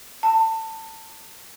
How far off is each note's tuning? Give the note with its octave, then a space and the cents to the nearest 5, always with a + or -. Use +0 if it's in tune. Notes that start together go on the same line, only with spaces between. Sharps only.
A5 +25